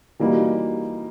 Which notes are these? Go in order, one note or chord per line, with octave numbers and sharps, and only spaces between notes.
E3 G3 A#3 D#4 F#4